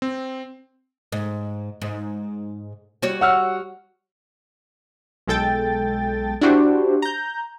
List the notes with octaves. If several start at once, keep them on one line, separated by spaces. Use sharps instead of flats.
C4
G#2
G#2
G3 F#4 C#5
F#5 E6 F6
B1 G#3 A4 G5 A6
D4 E4 F#4 G4 C5
A#5 G6